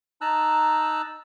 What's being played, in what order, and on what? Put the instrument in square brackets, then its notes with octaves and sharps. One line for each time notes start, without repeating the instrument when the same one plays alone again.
[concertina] D#4 A5 A#5 E6 F#6